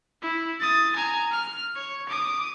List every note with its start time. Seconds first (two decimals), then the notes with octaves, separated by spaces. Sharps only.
0.22 E4
0.60 D#6 A6
0.96 G#5 A#5
1.31 F6
1.76 C#5
2.09 D6 D#6